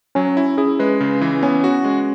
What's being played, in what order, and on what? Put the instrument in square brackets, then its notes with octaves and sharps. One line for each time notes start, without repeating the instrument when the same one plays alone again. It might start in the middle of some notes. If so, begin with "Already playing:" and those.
[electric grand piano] F#3 [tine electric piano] C#4
[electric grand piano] E4
[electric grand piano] E4 [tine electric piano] G#4
[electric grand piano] G#3 [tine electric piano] B4
[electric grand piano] C#3
E3
[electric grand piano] B3 [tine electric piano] C#4
[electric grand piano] F#4
G#3